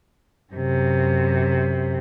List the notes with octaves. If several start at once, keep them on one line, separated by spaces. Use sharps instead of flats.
F#2 C3